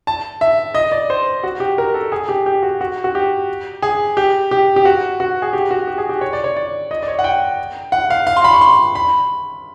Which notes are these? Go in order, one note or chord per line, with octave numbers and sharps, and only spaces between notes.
A5
E5
D#5
D5
C5
F#4
G4
A#4
A4
G#4
G4
G4
F#4
F#4
F#4
G4
G#4
G4
G4
G4
F#4
F#4
G#4
G4
F#4
G4
G#4
G4
C#5
D5
C#5
D5
D#5
D5
C#5
F#5
G5
F#5
F5
F5
C6
B5
C#6
C6
B5